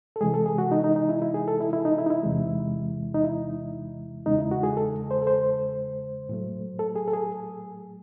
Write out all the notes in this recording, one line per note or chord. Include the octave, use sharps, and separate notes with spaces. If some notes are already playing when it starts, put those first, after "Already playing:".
A4
C3 E3 G#3 G#4
A4
G#4
F#4
D#4
D#4
D#4
E4
E4
G#4
A4
E4
E4
D#4
E4
D#4
E4
E2 C3 E3 G#3
D#4
E4
E2 C#3 G#3 D#4
E4
F#4
G#4
A4
C5
A4
C5
A2 F#3 A3
A4
G#4
A4
G#4